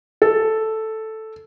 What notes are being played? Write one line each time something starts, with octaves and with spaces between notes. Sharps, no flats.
A4